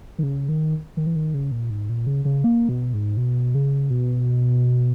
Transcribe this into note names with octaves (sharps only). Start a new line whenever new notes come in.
D#3
C#3
D#3
D#3
E3
D#3
C#3
A#2
G#2
A#2
C#3
C#3
A#3
B2
G#2
B2
C#3
B2